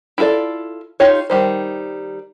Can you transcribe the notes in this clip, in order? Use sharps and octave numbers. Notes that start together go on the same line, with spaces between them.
E4 F4 G#4 A4 D5
D#4 F4 G4 C#5
D#3 G3 C5